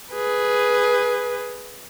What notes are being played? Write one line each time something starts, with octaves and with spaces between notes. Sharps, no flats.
G#4 B4